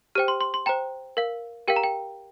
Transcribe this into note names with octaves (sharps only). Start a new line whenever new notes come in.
G4 C5 G5 F6
C6
C6
C6
C5 G5 A#5
A#4 F5
G4 A#4 F5 G5
A#5
G5